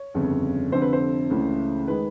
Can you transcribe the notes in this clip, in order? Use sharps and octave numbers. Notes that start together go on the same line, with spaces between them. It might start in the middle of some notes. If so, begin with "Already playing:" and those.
Already playing: C#5
G1 F2 C#3
F1 F2 D3 C5
B4
C5
C#2 C#3 E3 A3
D#3 G#3 B4